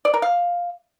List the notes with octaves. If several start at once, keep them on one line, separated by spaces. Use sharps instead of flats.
D5
A#4
F5